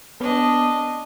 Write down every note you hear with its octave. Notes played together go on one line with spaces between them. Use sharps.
B3 D4 D#5